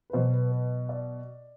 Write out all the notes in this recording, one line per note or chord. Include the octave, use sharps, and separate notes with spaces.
B4
B2 F#3 C5
B4
B4
D5